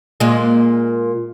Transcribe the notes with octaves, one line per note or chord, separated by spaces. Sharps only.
A#2 G#3